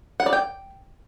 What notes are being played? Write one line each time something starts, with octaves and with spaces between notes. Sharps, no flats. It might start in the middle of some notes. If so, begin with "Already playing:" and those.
F#5
D5
G5